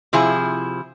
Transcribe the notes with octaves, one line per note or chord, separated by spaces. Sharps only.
C3 F3 E4 G#4